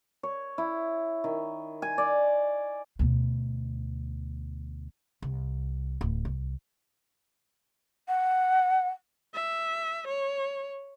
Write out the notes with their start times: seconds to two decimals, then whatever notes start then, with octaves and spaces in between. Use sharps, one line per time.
0.23 C#5
0.58 E4
1.24 D#3
1.82 G#5
1.98 D5
2.99 D2 B2
5.22 C2
6.01 D1
6.25 C2
8.08 F#5
9.34 E5
10.08 C#5